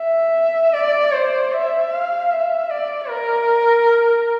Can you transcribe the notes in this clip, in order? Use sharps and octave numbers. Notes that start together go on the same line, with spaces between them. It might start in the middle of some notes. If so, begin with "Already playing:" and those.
Already playing: E5
D5
C5
E5
F5
E5
D5
A#4